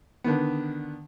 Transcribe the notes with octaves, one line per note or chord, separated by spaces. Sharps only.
D3 D#3 B3